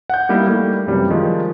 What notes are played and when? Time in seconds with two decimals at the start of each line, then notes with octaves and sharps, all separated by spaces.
0.10 F#5 G6
0.29 G3 A#3 B3 D#4 E4
0.47 G3 A3 A#3
0.86 F#2 C3 E3 G3
1.10 D#3 F3 G#3 D#4